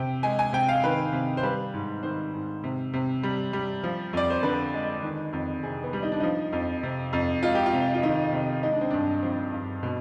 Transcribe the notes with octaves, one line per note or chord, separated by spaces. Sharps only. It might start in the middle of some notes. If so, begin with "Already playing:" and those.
Already playing: C3 G5
G#3 G#5
G#5
C3 G5
F5
D#3 B4
C3
C5
G3 B4
G#2
D#3 C5
G#2
C3
C3
G3
G3
F3
F2 D5
C5
D3 B4
G#3
D#3
F2
C3 G#4
B3
G3
D#4
D4
F3 D#4
F2
C3
F2
G#3 F4
G4
F4
C3
F4
D#3 D#4
C3
G#3 D#4
D4
C4
G2 D4
F3 C4
G2
B2